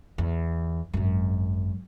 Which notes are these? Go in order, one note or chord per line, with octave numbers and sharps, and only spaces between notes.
E2
G#1 F#2